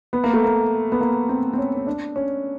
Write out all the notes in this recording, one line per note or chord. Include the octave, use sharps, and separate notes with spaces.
B3
A#3
A3
A#3
B3
A#3
C4
C4
C#4
C#4
D4
C#4